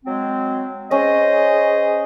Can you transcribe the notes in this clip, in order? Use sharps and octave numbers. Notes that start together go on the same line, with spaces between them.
F#3 G#3 C4
C#4 G#4 C5 D#5